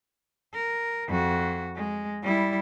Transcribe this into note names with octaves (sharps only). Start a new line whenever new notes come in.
A#4
F2 F#4
G#3
G3 E4